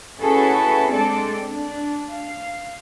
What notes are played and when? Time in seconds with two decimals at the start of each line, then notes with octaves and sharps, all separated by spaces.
0.21 C#4 E4 F#4 G#4 A4 B4
0.91 G#3 C4 D4 A4 D5
1.50 D4
2.14 F5